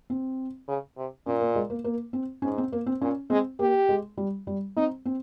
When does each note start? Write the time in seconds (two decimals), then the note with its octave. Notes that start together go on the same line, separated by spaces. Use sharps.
0.10 C4
0.68 C#3
0.97 C3
1.26 A#2 C#4
1.40 A#3
1.56 G#3
1.70 A#3
1.84 A#3
2.13 C4
2.42 G#2 C#4
2.58 C4
2.72 A#3
2.86 C4
3.01 A#2 C#4
3.30 G#3 C4
3.59 A#3 G4
3.89 G#3
4.17 G3
4.47 G3
4.77 C4 D#4
5.06 C4